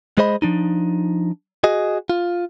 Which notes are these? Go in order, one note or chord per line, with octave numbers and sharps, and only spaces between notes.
G#3 G#4 C5 D#5 B5
F3 D4 D#4
F#4 G#4 D#5
F4